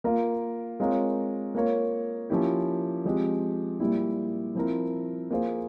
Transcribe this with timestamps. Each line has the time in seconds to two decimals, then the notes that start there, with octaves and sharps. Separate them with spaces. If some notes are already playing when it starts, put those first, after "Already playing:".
0.04 A#3 F4 A#4
0.80 G#3 C4 F4 A#4 C#5
1.55 A#3 F4 A#4 C#5
2.30 F3 A#3 C#4 E4 G4
3.05 F3 G#3 C4 G4
3.80 A#2 G3 A#3 E4 G4
4.55 F3 C4 E4 A#4
5.31 A#3 F4 G#4 C5